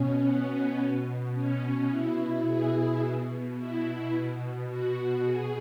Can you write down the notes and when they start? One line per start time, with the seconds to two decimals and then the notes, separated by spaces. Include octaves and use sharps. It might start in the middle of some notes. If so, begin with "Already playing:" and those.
Already playing: B2 C#4
0.23 B3
0.78 B2
1.34 C#4
1.90 B2 E4
2.46 G#4
3.02 B2
3.57 E4
4.13 B2
4.69 F#4
5.25 B2 G#4